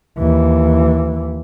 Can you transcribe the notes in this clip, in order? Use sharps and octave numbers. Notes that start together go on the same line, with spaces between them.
D#2 E3